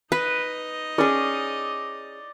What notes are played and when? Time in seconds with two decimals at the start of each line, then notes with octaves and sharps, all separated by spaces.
0.12 D#4 B4 D#5
0.98 C#4 G#4 D5